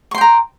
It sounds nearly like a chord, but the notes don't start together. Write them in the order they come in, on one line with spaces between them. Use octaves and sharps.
C#6 C6 G5 A#5